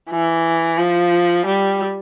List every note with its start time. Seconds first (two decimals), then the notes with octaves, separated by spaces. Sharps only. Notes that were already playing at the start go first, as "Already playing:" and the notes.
0.11 E3
0.78 F3
1.46 G3